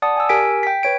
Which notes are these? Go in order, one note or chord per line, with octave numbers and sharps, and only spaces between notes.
D5 F#5 A5 D#6
G#5 E6
G4 A#4 G#5 B6 D7
G5 B6
B4 C#5 D7